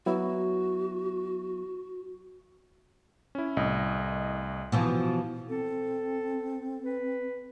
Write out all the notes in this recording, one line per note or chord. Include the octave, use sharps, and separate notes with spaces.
F#3 B3 E4 F#4
C#4 E4
C2 A2 D#5
B2 E3 F3
C4 A4
B4